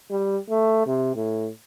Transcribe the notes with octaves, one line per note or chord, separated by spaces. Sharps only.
G3
A3
C3
A2